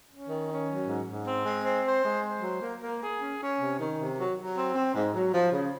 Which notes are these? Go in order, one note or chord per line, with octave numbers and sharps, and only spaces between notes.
C#4
D#3
C#4
F#3
G#2
G#2
C4
G#3
C4
C5
G#3
C5
F#3
A#3
A#3
G#4
C#4
C#4
C3
D#3
C3
F#3
F#3
C4
C4
G#2
F#3
F3
C#3